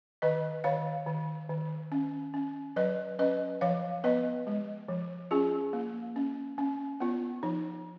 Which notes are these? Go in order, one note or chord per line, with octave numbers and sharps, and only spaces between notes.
D#3 B4 D#5
D#3 C#5 F5
D#3
D#3
C#4
C#4
F#3 B4 D#5
C#4 B4 D#5
F3 C#5 F5
B3 B4 D#5
G#3
F3
C#4 F4 G#4
A#3
C#4
C#4
B3 F4
F3 D#4